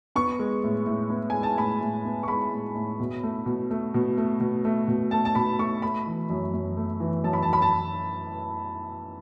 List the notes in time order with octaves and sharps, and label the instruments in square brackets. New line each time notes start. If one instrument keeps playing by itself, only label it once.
[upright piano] B3 C#6
G#3
A2
A2
B3
G#3 G#5
A5
A2 B5
A2
B3
C#6
G#3 B5
A2
A2
B2
A3
B2
A3
B2
A3
B2
A3
B2
A3 A5
A5
B2 B5
A3 C#6
A3 B5
E3
F#2
F#2
A3
E3
F#2 A5
B5
A5
F#2 B5
A5